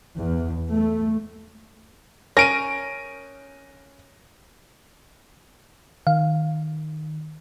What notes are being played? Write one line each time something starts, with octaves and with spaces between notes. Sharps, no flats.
E2
A3
C#4 A#4 A#6 D7 D#7
D#3 F5